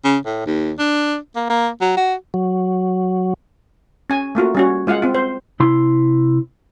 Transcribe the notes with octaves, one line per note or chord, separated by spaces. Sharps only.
C#3
A2
D#2
D4
A#3
A#3
F#3
F#4
F#3
C#4 G#5
A3 A#3 F4 F#4
G3 C#4 F#4
G#3 F4 F5 F#5
C4 F4
C5
C3 E4 C6